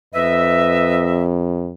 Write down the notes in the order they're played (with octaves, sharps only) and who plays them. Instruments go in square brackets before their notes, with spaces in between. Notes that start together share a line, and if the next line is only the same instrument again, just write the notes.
[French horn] F2 [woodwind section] B4 D#5 E5